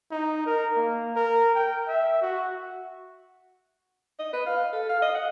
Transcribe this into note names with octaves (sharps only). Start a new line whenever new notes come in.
D#4
A#4
A#3
A#4
G5
E5
F#4
D#5
B4
F5
A4
F5
D#5
F#5